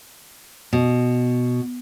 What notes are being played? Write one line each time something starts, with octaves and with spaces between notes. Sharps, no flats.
B2